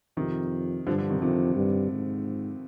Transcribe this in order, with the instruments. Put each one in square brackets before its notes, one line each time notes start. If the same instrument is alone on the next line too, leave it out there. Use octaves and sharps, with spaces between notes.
[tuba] F2 [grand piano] C3 D#3
[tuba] G2 [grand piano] D3 F3
[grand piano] D3 F3
C3 D#3
[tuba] F2 [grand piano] C3 D#3
[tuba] G2
G#2